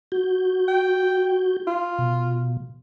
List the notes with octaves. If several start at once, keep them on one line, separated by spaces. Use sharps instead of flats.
F#4 G6
G5
F4
B2